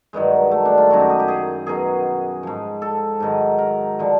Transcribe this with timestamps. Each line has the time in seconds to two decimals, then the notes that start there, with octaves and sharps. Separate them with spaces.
0.13 G2 D#3 F#3 G#3
0.51 A3
0.65 D4
0.78 F4
0.90 F#2 D#3 F#3 F#4
1.00 G4
1.10 G#4
1.19 G4
1.28 G#4
1.66 B2 F#3 G#4
2.43 G#2 F3
2.82 A4
3.20 G#2 D#3 F#3
3.58 A#4
3.99 D3 F3